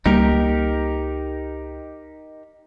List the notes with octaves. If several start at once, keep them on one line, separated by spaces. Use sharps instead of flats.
C#2 G3 A#3 D#4 G4 A#4